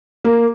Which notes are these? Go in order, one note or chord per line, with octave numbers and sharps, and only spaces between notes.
A#3